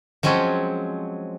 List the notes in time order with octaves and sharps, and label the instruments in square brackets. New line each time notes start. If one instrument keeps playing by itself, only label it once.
[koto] F3 F#3 G#3 C4 C#4